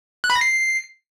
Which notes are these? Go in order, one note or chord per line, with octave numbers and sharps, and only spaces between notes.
F#6
B5
A#6
C7